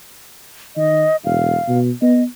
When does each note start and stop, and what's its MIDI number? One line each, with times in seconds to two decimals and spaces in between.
0.76 1.06 51
0.76 1.17 75
1.25 1.56 28
1.25 1.79 77
1.68 1.91 47
2.02 2.25 59
2.02 2.23 75